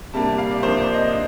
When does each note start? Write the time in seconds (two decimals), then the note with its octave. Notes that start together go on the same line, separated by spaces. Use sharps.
0.14 C3 G3 A#3 D4 A5
0.38 F5
0.51 D5
0.63 C3 F3 A#3 D4 C5
0.79 D5
0.94 D#5
1.12 D4